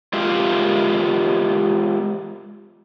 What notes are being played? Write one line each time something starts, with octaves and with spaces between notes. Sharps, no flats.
G#3 F4 G4 A#4 E5 F5